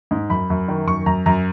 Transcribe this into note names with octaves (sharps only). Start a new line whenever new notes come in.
G#2
F#2 B5
F#2
D#3
F#2 C#6
F#2 A#5
F#2 A#5